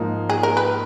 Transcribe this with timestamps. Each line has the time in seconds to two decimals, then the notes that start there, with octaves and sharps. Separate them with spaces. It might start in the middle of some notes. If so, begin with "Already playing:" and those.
Already playing: G#2 F3 A#3 D#4
0.30 G#4
0.43 A#4
0.57 B4